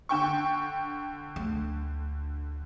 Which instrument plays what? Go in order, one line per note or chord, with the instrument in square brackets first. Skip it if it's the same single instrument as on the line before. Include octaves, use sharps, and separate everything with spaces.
[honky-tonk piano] D3 G5 C#6
[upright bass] D2